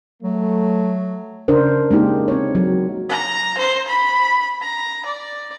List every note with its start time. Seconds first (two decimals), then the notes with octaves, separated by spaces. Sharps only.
0.23 F#3 A3
1.48 C#3 D4 A#4 C5
1.91 G#3 A#3 D#4 G4
2.28 C4 C#5
2.55 F#3
3.09 A#5
3.58 C5
3.88 B5
4.61 A#5
5.06 D5